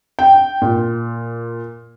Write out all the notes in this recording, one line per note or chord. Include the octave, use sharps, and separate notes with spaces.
G5
A#2